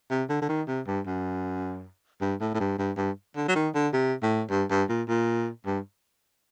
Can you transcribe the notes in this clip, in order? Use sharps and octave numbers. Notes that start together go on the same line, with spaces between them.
C3
D3
D3
D#3
C3
G2
F#2
G2
A2
A2
G2
G2
G2
D3
F#3
D#3
D3
C3
A2
G2
G2
A#2
A#2
G2